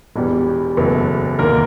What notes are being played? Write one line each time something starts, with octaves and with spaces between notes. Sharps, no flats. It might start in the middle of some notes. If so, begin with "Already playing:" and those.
E1 E2 B2 G3
F#1 E2 B2 F#3 A3
F1 D#2 D3 A#3 A#4